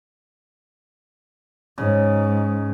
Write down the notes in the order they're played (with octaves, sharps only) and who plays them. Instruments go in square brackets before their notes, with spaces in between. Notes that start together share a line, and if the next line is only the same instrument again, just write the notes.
[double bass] G#2 [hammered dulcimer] C#3